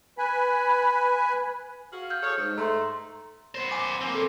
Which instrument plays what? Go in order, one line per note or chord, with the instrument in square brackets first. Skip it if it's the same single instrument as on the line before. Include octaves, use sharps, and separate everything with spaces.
[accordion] B4 G#5 B5
[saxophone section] F#4 G#4 F5
[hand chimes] F6 G6
[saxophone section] G#4 A4 C#5
G#2
[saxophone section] G#2 A3 [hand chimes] A#5 C6
[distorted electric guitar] B3 C5
[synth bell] G#5 D6
[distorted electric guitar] A#3 C4
[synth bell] A4